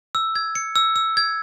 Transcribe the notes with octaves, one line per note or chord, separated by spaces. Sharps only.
E6
G#6
C#7
E6
E6
G#6